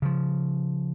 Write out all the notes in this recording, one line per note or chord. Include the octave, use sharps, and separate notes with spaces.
C#3 F3